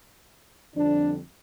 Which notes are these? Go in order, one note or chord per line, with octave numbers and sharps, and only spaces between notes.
F2 D3 G3 D4